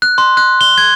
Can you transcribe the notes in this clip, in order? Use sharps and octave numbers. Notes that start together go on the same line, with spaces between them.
F#6
C6
F#6
G7
G#6